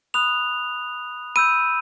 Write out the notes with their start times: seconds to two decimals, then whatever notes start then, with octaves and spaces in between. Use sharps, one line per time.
0.14 B5 D#6 F#6 F7
1.36 B5 E6 G6 D#7